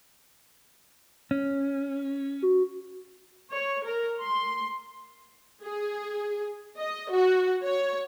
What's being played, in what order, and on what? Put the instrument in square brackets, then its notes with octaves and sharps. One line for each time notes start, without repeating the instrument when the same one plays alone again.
[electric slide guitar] C#4
[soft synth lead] F#4
[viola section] C#5
A#4
C6
G#4
D#5
F#4
C#5